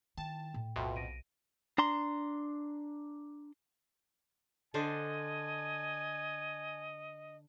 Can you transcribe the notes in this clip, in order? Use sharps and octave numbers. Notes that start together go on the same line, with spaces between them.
D#3 E4 G5 A5
A2
B1 F2 B2 E5 G5 C6
A#6 D7 D#7
D4 A#5 C6
D3 D4 C5 D#5 G#5